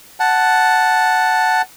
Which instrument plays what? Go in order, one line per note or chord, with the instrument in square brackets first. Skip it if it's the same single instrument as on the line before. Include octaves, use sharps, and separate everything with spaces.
[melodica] F#5 A5